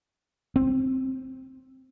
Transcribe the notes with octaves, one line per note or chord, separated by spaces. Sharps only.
C4